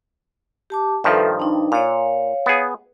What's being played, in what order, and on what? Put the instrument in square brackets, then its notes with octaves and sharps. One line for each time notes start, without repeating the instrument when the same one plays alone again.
[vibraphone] G4 A5 D6
[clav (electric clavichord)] G2 D#3 F3 [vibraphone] A4 B4 E5
[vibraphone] D4 D#4
[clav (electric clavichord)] A#2 [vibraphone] C#5 F5
[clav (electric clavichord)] B3 G#4